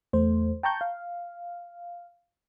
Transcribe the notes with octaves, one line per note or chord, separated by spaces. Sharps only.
E2 A3 C5
G5 A5 A#5 C#6 G6
F5